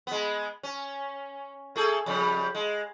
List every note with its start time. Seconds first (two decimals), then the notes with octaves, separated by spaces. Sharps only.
0.07 G#3 B3
0.63 C#4
1.76 A3 G#4 A4
2.06 F2 C#3 G3
2.55 G#3